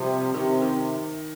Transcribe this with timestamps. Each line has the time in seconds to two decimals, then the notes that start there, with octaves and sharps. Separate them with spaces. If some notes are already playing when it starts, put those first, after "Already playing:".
Already playing: C3 F3 G3
0.34 C3 D#3
0.62 D#3